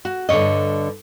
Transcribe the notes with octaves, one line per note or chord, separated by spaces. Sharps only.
F#4
G2 D3 F3 C#5 D#5